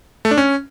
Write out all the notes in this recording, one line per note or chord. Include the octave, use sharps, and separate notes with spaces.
A3
D4
C#4